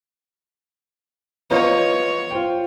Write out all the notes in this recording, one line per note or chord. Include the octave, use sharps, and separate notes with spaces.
B3 F4 C#5 D#5
F4 C5 G5